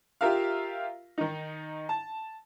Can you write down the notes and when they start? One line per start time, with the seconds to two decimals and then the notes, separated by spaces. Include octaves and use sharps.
0.21 F4 G4 A#4 E5 F5
1.18 D#3 D#4
1.89 A5